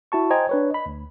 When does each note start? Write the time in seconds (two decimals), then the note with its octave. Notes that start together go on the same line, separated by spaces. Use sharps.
0.12 E4 F#4 A5 C#6
0.30 C5 D#5 G5 G#5 A#5 G#6
0.49 D4 B4 C#5
0.70 D#5 B5
0.86 D2